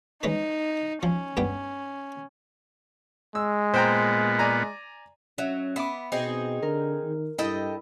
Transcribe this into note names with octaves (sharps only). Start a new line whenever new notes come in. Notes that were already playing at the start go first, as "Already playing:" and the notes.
G#3 C#4 D#4 B4
F3 C#4
G2 B3 G5
G#3 E6
A#2 B3 C5 G5 A#5
D5 G#5 A#5
F#3 C#4 E5
B3 E5 B5 D6
B2 C4 D#4 G#4 D#5
D3 A#4
D#3
G2 E4 A4 D#5 G5